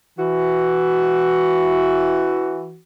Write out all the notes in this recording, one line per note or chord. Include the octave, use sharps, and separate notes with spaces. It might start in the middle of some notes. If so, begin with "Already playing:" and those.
E3 F#4